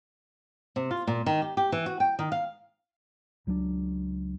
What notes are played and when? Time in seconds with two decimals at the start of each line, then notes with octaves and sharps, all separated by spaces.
0.76 C3
0.91 F4
1.07 A#2
1.26 D#3
1.42 G4
1.57 G4
1.72 E3
1.86 F#4
2.00 G5
2.19 D#3
2.32 F5
3.47 C#2 F#3 G3 D4